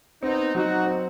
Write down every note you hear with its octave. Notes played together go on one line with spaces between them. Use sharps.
B3 C4 D#4
F#3 D#4 F#4
C4